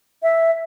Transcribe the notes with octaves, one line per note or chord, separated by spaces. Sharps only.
E5